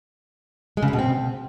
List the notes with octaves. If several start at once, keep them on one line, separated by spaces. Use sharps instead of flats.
G#3
C#3
F#2
B2
C4